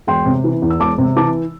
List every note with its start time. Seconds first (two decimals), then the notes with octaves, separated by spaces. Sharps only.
0.07 E1 G5 C6
0.26 C3
0.44 E3
0.62 E2
0.70 E6
0.80 E1 A5 D6
0.98 C3
1.16 E3 A5 D6